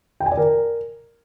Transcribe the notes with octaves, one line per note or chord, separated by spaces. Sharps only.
G5
G#5
D5
A#4